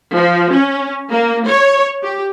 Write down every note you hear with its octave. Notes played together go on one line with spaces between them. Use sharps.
F3
C#4
A#3
C#5
G4